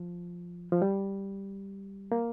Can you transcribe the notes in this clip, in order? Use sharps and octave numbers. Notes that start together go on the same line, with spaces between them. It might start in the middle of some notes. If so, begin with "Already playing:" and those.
Already playing: F3
F3
G3
A#3